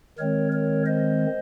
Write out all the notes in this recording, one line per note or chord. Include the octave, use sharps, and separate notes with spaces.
D#3 G#3 C4 A#4 C#5
A#4 C#5
C5 D#5